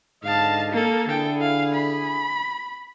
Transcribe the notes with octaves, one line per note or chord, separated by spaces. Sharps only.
G#2 D3 D#5 F5 A5
A#3 A4
D3 E4 G#4 A4 G5
F5
B5